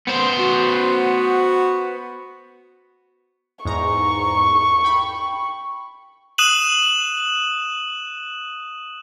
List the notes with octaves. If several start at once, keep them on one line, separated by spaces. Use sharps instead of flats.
B3 C5
F#4
E2 G#2 A#5 C#6
G5 B5
D#6 F#6 D#7 E7 F#7